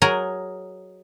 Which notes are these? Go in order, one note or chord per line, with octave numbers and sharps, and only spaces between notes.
F#3 G#4 A#4 D#5